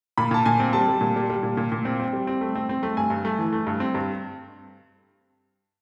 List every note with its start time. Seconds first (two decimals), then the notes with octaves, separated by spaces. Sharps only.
0.18 A#2 B5
0.31 A#2 A5
0.46 A#2 G#5
0.60 C4
0.73 G3 A5
0.88 G3
1.01 A#2
1.16 G3
1.30 G3
1.43 A#2
1.57 A#2
1.72 A#2
1.85 C4
2.00 C4
2.13 G3
2.27 C4
2.41 A3
2.55 C4
2.69 C4
2.83 A3
2.97 G2 G#5
3.10 G2
3.25 A3
3.39 E3
3.53 A3
3.67 G2
3.80 C4
3.94 G2